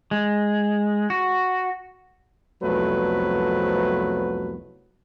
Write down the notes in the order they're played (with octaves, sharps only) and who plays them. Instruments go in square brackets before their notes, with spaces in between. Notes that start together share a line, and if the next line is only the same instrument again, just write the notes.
[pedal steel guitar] G#3
F#4
[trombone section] C2 F2 F#3 A3 B3 B4